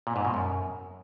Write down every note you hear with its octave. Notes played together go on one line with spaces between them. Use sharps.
A#2
G#2
B2
F#2